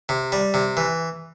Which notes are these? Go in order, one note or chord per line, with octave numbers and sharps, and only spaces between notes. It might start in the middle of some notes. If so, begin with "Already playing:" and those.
C3
G3
C3
E3